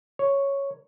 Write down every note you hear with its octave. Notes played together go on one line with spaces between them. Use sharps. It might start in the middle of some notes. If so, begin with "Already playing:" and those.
C#5